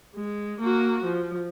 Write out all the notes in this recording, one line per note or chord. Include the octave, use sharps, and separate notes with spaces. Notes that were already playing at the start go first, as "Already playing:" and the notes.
G#3
A#3 F#4
F3